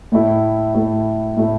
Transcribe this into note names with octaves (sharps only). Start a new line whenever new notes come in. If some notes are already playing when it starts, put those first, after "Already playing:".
A2 A3 E4
A2 A3 E4
A2 A3 E4